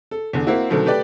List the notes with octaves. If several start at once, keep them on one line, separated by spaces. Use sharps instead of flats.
A4
E2 D3
A#3 C4 E4 F#4
B2 D3 D#3 F#3 A3 C4
A3 G4 B4 D5 G5